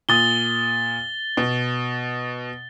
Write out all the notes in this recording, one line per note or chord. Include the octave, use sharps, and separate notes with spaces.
A#2 D#6 A6 G7
B2